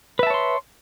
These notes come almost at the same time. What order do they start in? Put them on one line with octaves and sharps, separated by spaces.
B4 E5 A5 C#5 C6